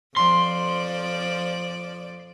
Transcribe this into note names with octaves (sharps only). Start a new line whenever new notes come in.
F2 F3 D5 C6